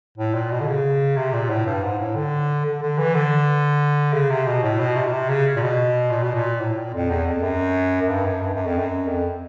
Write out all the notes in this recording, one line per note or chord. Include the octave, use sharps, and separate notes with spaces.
A2
A#2
B2
D3
C#3
C3
A#2
A2
G2
G#2
A2
D3
D3
D3
E3
D3
C#3
C3
B2
A2
B2
C3
B2
C3
C#3
A#2
B2
A#2
B2
A#2
A2
A#2
F2
E2
F2
F#2
F#2
G2
F#2
G2
F#2
F2
F#2
F2